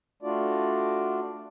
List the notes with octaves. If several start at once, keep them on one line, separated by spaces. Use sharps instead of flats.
A3 D4 F4 F#4 D5